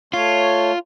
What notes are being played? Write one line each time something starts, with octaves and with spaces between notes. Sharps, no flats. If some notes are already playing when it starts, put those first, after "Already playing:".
A3 F4 C#5